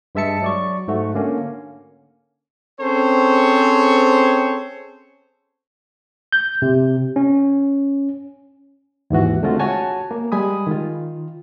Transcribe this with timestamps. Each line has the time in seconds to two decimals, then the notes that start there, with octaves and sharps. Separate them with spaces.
0.15 G2 G#3 E5 A5 C#7
0.42 F#3 D5 C#6
0.88 G#2 A3 F#4
1.14 D3 A#3 C#4
2.80 C4 C#4 G#4 A4 C5 C#5
6.33 G6
6.62 C3
7.16 C#4
9.10 D#2 G#2 E3 F#4
9.43 D3 G#3 A3 C4 F4 F#4
9.59 F#4 C#5 G#5 A5
10.11 A#3
10.32 G3 G#3 G#5 B5 D#6
10.67 D#3 F4